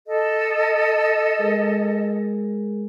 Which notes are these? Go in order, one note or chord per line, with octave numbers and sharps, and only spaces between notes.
A4 D#5
G#3 G#4 A#4